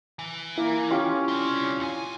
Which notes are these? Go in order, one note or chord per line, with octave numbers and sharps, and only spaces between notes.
E3
A#3 E4
C#4 F4 G4
C4 D5
D#2 G#5